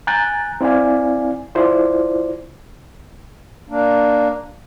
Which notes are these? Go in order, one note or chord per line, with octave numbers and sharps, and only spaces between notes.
G#5 A#5 F#6 G6 A6
C4 E4 D5 F5 G#5
E4 F4 C5 D5
A#3 D4